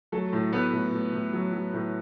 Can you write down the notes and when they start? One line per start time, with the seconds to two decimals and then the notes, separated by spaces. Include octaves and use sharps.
0.12 F#3 A3 A4
0.33 A2
0.52 A2 B3 B4
0.73 A2
0.92 A2
1.13 A2
1.33 F#3
1.53 F#3
1.73 A2